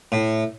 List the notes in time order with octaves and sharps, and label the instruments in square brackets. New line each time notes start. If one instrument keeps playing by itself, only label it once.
[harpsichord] A2